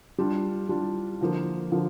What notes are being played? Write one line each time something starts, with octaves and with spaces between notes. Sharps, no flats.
G3 D4 F4
G3 D4 F4
D3 F3 A#3
D3 F3 A#3